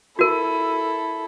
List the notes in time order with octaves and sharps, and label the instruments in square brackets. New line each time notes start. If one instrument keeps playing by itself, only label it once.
[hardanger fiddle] E4 A4 [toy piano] F#4 A#4